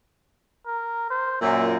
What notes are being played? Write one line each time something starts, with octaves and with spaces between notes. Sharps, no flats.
A#4
C5
F#2 A#2 E5